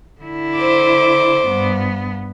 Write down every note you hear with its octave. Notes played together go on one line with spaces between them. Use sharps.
D3 E4
C5 D6
G2 B3